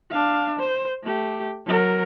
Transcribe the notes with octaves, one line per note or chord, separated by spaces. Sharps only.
D4 F5
C5
A3 G4
F#3 A#4